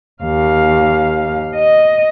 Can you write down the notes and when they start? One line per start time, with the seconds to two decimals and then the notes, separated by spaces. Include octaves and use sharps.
0.23 D#2 F5
1.56 D#5